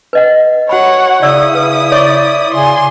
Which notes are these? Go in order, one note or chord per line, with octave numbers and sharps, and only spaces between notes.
B4 D#5 F#5
F#4 C#5 F#5 B5
C#3 E4 D5 D#6 E6
B4
C#5 D5 C#6
C#3 G#5 C6